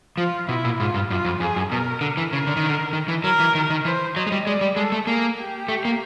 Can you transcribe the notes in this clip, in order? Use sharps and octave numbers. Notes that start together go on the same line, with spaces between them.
F3 F4
B2 E4
A#2
G#2 F4
G2
F#2 F4
F2
F2 G#4
F#2
B2 A#4
D3
E3
C#3 A#4
D3
D#3
D3
D#3
E3
F#3 A#4
E3
D#3
D#3
E3 C5
F#3 D#5
G#3
G3
G#3 D5
G3
G#3 A4
A3
A#3 G#4
G4
A3
A#3